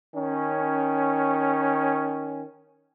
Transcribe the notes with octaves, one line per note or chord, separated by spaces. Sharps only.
D#3 C#4